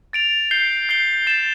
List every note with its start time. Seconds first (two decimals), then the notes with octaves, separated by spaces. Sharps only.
0.13 A6 D7 F7
0.51 G6 C7 G7
0.89 G6 C7 G7
1.27 A6 E7 G7